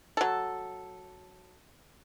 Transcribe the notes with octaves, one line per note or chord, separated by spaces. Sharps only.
F#3 A4